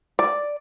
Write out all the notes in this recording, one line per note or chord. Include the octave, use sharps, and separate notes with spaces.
D5